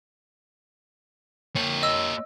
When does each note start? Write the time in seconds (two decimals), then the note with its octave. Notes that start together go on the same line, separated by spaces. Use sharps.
1.56 A#3 C#5
1.83 D#5 E6